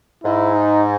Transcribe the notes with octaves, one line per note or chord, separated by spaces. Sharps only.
G#2 E4
D#4